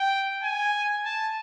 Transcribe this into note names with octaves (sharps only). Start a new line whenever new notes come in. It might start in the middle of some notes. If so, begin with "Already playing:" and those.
Already playing: G5
G#5
A5